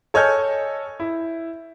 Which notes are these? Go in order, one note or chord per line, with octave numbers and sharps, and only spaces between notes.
A4 C#5 D#5 G#5 F6 G6
E4